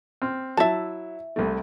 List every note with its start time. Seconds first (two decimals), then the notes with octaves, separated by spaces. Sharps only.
0.22 C4 F6
0.57 F#3 E4 E5 A5
1.36 C2 C3 A3